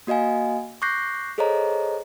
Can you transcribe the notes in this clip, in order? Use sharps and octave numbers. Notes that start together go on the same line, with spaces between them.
A#3 F#4 D#5 F5 G#5
C#6 D6 F#6 G6 A#6 C7
G#4 A4 C5 C#5 D#5 A#5